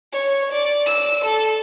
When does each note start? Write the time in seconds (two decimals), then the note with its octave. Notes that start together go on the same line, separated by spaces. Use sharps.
0.13 C#5
0.52 D5
0.86 E6
1.25 A4